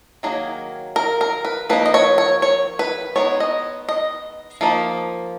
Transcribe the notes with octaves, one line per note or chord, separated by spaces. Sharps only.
D#3 F#3 A#3 G#4
A#4
A#4
B4
F3 A#3 D#4 B4
D#5
C#5
C#5
C#5
B4
G#3 B3 D#4 C#5
D#5
D#5
F3 A#3 D#4